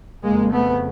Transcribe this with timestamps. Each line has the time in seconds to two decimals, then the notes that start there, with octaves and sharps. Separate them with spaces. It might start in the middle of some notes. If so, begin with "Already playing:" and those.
0.23 F2 C#3 G#3 A#3
0.52 A3 B3